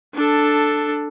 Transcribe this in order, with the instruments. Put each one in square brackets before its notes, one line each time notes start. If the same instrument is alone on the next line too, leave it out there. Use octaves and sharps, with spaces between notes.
[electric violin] D4 A4